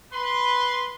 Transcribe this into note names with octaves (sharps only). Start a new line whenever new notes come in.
B4 C6